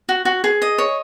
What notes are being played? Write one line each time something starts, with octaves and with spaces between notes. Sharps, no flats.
F#4
F#4
G#4
D#5
C#5